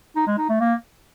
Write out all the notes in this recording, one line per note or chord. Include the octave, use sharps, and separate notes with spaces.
D#4
G#3
D#4
A3
A#3